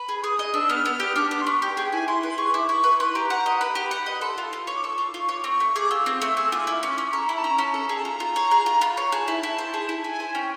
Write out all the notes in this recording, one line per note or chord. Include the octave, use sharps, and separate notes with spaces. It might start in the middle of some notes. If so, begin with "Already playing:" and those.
Already playing: B4 B5
G#4
G#4 D#6
D#5
D4 E6
B3 F6
B3
G4
D4 D6
B3 D6
C6
B3 C#6
G4 G5
G#4 G5
E4 G#5
E4 C6
B4
G#4 C#6
E4 D6
E4 C#6
B4
B4 C6
G4 A#5
F#5 A#5
D#5
B4 B5
G4
F#5
D#5 B5
A4 C6
F4
F4
C#5
D6
A4 C#6
F4
F4
C#5
D6
C4 C#6
A3
G#4 D6
F4 E6
C4
A3
G#4 E6
F4 D6
E4
C#4 D6
C#4 C#6
A4 A#5
E4 B5
A5
C#4 A#5
C#4 A5
A4 A#5
G#4 A#5
A5
F4 A#5
F4
C#5
G#4
F4
F4 B5
C#5 A#5
G#4 A5
E4
E4
C5
G#4
E4
E4 G#5
C5
C#4 G5